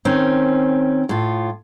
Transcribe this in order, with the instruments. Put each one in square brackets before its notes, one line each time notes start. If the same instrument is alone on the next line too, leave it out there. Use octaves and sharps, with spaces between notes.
[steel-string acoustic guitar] D#3 C4 C#4
A2 F4